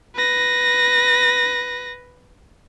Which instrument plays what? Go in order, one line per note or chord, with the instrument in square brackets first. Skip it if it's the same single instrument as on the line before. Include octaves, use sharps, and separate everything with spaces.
[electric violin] B4 A#6